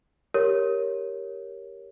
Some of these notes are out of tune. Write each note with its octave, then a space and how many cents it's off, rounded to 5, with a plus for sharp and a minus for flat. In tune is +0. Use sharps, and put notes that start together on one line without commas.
G4 +0 A#4 +0 C#5 +0